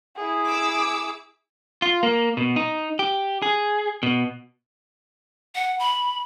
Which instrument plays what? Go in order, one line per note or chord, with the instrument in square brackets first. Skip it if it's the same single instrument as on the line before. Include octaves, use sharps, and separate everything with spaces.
[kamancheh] E4 G#4
[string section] D6 E6
[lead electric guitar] F4
A#3
B2
D#4
G4
G#4
B2
[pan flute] F#5
B5